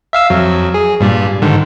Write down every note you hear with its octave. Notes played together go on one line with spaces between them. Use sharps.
E5 F5 E6
F2 F#3
G#4
G2 A#2 G3
G#2 D3 D#3